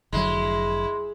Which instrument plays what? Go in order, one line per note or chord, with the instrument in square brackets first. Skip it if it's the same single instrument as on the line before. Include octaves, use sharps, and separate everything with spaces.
[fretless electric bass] F1 D3 F#3 [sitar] G#3 [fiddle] E4 [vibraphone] C6